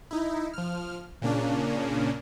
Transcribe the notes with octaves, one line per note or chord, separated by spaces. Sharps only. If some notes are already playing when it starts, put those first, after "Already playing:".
D#4 E4
F3 F6
A#2 C#3 A#3 C#4 D4